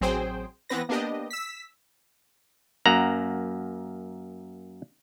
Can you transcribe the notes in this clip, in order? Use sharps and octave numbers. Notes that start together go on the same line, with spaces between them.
A1 F#3 C4 G#4 C5 G5
E3 B3 C4 B4 A#6
A#3 B3 D4 G4 D#5
E6 B6
F#2 A#3 F#5 A#5